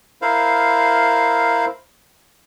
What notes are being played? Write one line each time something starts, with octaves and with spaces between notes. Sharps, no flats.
E4 A#4 C5 F5